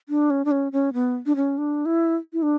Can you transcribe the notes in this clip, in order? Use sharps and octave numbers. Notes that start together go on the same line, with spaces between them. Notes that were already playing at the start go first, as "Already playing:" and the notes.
D4
C#4
D4
C#4
C#4
B3
D4
C#4
D4
E4
E4
D4